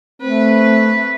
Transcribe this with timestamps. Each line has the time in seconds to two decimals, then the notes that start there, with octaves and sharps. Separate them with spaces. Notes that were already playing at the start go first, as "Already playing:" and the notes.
0.22 A3 C4 B4